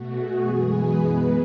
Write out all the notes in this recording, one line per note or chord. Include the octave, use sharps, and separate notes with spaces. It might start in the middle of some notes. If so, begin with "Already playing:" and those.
Already playing: B2 A3 F#4
G#4
F#2 E3 G#3 B3
B4
B2 G#3 B3